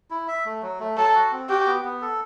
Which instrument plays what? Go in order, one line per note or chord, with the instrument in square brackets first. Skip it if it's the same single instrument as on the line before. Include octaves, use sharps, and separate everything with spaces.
[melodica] E4
E5
A3
F#3
A3
[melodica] F#3 [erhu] A4
[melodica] F#4
C4
[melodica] F#4 [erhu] G4
[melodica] B3
B3
A4